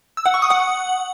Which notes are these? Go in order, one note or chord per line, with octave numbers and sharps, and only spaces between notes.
E6
F#5
C#6
D#6
F#5